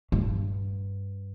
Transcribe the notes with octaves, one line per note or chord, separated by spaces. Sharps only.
G2